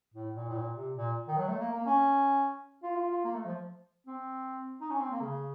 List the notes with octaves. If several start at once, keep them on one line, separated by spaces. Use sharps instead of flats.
A2
A#2
A2
A#2
C3
A#2
D#3
F#3
A3
A#3
A#3
C#4
F4
F4
F4
A#3
A3
F3
C4
D#4
C#4
C4
A#3
C#3